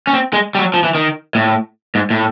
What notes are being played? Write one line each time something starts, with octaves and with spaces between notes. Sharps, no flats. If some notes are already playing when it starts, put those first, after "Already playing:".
C#4
C4
G#3
G3
F#3
F3
E3
D#3
A2
G#2
A2